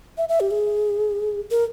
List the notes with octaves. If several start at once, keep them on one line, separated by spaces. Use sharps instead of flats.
E5
E5
G4
G#4
A#4